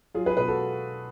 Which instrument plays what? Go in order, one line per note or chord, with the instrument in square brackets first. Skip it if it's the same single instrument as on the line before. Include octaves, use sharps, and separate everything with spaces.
[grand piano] F#3 F4 G#4
G#4 B4
B2 G#4 B4
F#4 A4